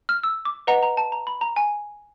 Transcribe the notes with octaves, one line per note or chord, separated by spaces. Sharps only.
F6
E6
D6
B4 D#5 F#5 A#5
A#5
A5
A#5
B5
A#5
G#5